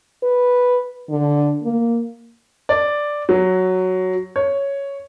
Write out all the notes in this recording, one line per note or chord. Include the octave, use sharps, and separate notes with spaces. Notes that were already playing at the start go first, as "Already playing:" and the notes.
B4
D3
A#3
D5
F#3
C#5